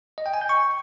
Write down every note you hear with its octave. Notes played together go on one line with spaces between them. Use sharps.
D#5
G5
G#5
G6
C#6